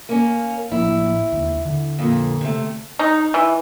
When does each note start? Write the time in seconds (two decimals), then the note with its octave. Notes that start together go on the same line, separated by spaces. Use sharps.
0.09 A#3 C#4
0.71 A2 F3 A#3 E4
1.32 D#2 D3
1.65 D3
1.99 F2 A#2
2.41 C3 A3
2.99 D#4
3.34 E3